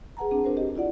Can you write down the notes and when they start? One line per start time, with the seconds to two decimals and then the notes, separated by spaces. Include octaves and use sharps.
0.17 G#4 B4 F#5 A5 A#5
0.31 C4 D4 G#4
0.44 D4 F#4 A#4 C5
0.57 G4 D#5
0.75 E4 F4 D5 F#5